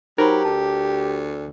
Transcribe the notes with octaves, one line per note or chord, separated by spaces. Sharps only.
F#3 D#4 G4 A#4 C5 B5
D2 A5